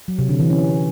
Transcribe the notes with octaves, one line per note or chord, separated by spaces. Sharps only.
F#3
C3
D3
E3
C#4